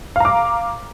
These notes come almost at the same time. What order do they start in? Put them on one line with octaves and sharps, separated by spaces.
F5 A#5 D6